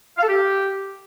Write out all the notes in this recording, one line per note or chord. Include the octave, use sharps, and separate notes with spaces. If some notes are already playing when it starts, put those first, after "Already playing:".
F5
A4
G4